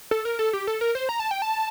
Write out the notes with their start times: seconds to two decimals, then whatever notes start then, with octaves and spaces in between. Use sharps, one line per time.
0.11 A4
0.25 A#4
0.39 A4
0.53 G4
0.67 A4
0.81 A#4
0.95 C5
1.09 A#5
1.20 A5
1.31 G5
1.42 A5